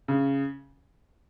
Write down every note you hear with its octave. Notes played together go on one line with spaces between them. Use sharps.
C#3